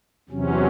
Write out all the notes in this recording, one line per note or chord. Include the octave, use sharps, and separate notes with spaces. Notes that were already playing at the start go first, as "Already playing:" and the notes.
E2 C3 F#3 C#4